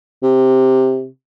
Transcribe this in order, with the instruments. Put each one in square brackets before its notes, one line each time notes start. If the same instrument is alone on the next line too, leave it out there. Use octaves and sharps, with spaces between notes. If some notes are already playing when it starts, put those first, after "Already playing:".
[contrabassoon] C3